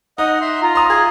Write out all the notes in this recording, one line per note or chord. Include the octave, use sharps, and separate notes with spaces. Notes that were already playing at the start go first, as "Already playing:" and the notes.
D#4 D#5 F#5 D#6
E5 C6
F4 A#5
C6 D#6
G#4 G#6